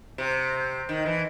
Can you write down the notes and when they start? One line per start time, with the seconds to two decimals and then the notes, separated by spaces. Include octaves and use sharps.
0.18 C3
0.89 D#3
1.06 E3